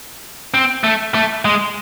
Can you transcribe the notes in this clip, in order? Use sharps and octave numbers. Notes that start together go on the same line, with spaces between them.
C4
A3
A3
G#3